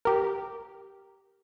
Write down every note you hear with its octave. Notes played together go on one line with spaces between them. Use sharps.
G4 A#4